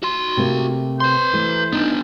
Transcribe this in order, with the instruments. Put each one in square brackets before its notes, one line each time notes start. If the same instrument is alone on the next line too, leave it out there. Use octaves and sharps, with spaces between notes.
[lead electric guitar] F#4 C6
[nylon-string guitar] C3 A3 A#3
[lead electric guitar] B4 C6 [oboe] C5
[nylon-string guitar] E3 A3
[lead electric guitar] B3 D4 [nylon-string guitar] D#4